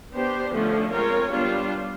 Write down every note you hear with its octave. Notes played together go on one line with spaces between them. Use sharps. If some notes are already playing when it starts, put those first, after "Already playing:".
B3 D4 G4 C5
D3 F3 A3 C#4
G#3 C4 F4 A#4 C#5
G3 B3 D4 F4